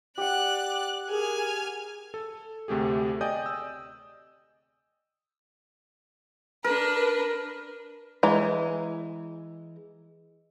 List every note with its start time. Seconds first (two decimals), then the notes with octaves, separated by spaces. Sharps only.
0.18 G4 D5 F#5 F#6
1.10 G#4 A#4 G#5 F6
2.14 A4
2.68 D2 C3 A3 G4 G#4
3.21 D5 D#5 G5 G#5 D#6 G6
3.46 E6
6.64 D4 A#4 B4
8.23 E3 G#3 A#5